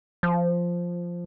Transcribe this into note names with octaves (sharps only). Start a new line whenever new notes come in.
F3